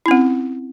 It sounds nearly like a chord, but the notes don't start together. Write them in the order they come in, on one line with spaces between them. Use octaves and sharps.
E4 C#4 C4